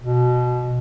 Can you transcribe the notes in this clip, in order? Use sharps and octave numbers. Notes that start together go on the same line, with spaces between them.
B2